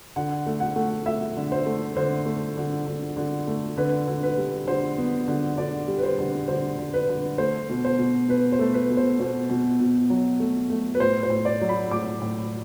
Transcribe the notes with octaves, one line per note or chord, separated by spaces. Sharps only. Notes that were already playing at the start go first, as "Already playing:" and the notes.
D3 F#5
A3
F#5
A3
A3 E5
D3
C5
A3
D3 C5
A3
D3
D3
D3
A3
D3 B4
D3
B4
G3
D3 C5
B3
D3
D3 D5
G3
B4
C5
D3
D3 C5
D3
B4
D3
A3 C5
B2
C5
B2
B2 B4
C5
A3
B4
B2
C5
B2 C5
B2
B2
F#3
A3
A3
B4
A2 C5
C5
A2
D5
F#3
B5
A2 D6
A2